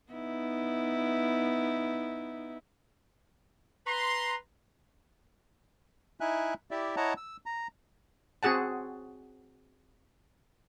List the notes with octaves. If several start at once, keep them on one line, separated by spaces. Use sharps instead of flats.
B3 D#4 E4
B4 A#5 C6
D#4 E4 E5 G#5 F#6
E4 G4 D5 E5
E4 C#5 D#5 F#5 A5 A#5
E6
A#5
C4 F#4 G#4 F#5 A5